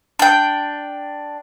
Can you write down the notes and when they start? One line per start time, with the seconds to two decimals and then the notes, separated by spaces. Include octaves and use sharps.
0.19 D4 G5